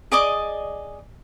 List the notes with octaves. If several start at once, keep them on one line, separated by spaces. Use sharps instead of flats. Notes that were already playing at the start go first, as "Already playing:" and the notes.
G#4 D5 D#5 D6